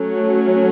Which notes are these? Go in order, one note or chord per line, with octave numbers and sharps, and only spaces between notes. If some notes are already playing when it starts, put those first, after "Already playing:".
Already playing: F#3 A3 C#4